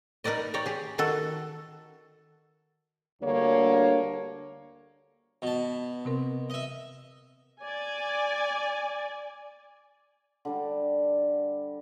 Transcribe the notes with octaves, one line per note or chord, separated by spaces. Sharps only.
D#4 A#4 B4 D5 D#5
C#5 D5 G5 A#5
G4 G#4
D#3 F#4 A4
D2 D3 G3 A#3 D4 C#5
B2 A5
C3 C4 A#4
D#5 E5
D5 G#5
D3 G3 A5